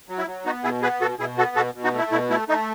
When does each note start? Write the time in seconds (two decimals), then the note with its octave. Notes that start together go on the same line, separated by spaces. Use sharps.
0.09 F#3
0.18 E4
0.27 F#3
0.45 B3 D#4 F#4
0.64 B2 E4 G#4
0.82 B3 G#4 B4
1.01 B2 F#4 A4
1.19 B2 E4 G#4
1.38 B3 F#4 A4
1.56 B2 F#4 A4
1.75 B2
1.84 D#4 F#4
1.94 A3 E4
2.12 B2 E4
2.30 A3 E4
2.48 A3 D#4